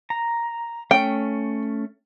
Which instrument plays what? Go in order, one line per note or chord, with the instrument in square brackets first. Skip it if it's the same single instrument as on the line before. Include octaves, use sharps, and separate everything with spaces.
[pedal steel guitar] A#5
[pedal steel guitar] A3 C#4 [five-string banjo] G5